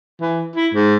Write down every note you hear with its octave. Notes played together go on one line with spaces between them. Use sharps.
E3
E4
G#2